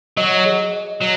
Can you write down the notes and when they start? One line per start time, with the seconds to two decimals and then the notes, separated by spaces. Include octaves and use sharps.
0.17 F#3 D#5
0.46 G#4
0.73 D#5
1.02 F#3